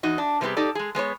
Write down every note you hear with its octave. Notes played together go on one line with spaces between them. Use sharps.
E2 D#4 F#4
D4
C3 G3 B3 C4 G4 G#4
D#4 G4 A4 D5
G#3 G#4
G#3 B3 C5 C#5